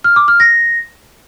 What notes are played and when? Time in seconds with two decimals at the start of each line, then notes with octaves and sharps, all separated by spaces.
0.04 F6
0.16 D6
0.28 F6
0.40 A#6